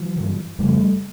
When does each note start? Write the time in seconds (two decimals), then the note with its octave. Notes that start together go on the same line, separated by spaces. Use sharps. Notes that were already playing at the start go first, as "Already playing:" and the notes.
Already playing: E3 F#3
0.16 G2 D3
0.59 F2 C#3 G3 A3